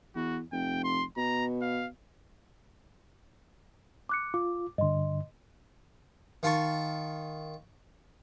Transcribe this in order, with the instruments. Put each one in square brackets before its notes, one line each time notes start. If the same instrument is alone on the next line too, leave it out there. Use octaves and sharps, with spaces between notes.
[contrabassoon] E2 [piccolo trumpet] F#4
[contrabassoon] F1 [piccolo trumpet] G5
[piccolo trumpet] C6
[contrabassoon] B2 [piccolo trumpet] A#5
[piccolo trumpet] F5
[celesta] D6 F#6 C#7
[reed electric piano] F4 [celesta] D6
[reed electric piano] G2 D3 [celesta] D#5 C6
[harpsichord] D#3 F4 A5 C#6